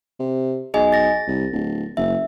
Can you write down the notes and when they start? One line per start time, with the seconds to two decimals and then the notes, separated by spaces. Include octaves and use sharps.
0.20 C3
0.74 B1 G#4 D#5 G#5
0.92 A6 A#6
1.28 C2
1.53 D1
1.97 F#1 E5